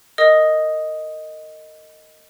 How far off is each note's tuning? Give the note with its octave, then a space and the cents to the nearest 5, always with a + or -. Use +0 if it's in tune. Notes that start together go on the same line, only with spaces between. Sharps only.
A#4 -25 D#5 +0 D#6 +0